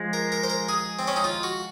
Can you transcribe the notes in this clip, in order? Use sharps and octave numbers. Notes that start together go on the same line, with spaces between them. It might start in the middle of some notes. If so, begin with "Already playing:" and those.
Already playing: F3 G#3
A#4
A#4
C5
A#4
G#4
C4
C#4
D#4
F4
F#4